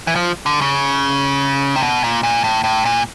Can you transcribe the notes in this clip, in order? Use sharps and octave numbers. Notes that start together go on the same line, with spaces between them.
E3
F3
D3
C#3
C3
B2
A#2
A#2
A2
A2
A#2